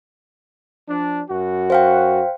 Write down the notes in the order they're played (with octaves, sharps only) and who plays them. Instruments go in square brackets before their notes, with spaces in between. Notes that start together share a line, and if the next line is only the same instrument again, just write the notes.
[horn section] F3 D4
F#2 F#4
[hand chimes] C5 F5 G5